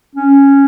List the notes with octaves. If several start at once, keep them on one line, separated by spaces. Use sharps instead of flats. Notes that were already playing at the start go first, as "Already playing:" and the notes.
C#4